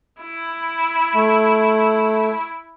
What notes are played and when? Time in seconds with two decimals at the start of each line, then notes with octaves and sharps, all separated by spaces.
0.22 E4
1.14 A3